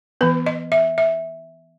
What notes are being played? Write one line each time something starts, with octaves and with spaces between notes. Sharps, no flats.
E3 B3 B4
D#5
E5
E5